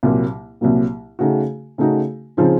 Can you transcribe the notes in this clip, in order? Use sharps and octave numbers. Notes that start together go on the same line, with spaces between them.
C2 A#2 F#3 A#3
C2 A#2 F#3 A#3
C#3 A3 D#4 F#4
C#3 A3 D#4 F#4
C#3 F3 C4 D#4